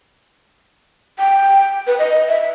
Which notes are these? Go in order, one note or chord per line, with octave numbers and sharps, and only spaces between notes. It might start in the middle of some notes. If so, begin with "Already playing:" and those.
G5
B4
D#5
E5